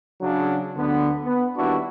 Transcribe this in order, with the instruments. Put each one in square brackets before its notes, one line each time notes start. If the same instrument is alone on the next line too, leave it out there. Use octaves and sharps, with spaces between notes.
[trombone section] C#3 F#3 D4
D2 D3 B3
B3
D#2 G3 B3 D4 E4 F#4